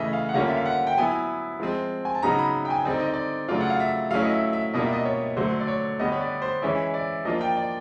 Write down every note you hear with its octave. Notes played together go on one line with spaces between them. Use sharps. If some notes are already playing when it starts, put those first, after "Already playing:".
Already playing: C#3 E3 A3 D#5 E5
F5
F#5
D3 G3 A#3 C#4 F4 F5
E5
F5
F#5
G5
F#3 B3 E4 G#5
F3 G#3 C4
G#5
A5
C#3 F#3 B3 D#4 A#5
B5
G5
G#5
D3 G3 C4 D#4 D5
D#5
D5
C#3 F#3 A3 D4 F4 D5
F#5
F5
E5
F#3 A3 C#4 E4 F5
D#5
E5
E5
B2 G3 A#3 D4 F4 D#5
E5
D#5
C#5
D3 F#3 A3 C5
D5
C#5
D3 G3 B3 D#5
C#5
D5
C5
E3 G#3 C#4 E4 C#5
D5
F3 A#3 D4 F4 D#5
G5
D5